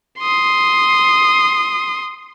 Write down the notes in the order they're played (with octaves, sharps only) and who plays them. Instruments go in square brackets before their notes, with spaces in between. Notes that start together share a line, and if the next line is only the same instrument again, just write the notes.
[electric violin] C6 D#6